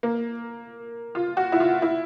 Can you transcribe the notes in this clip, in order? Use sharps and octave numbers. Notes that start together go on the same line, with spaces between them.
A#3
F4
F#4
E4
F4
E4